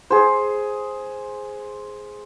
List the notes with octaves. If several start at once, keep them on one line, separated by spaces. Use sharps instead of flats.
G#4 C5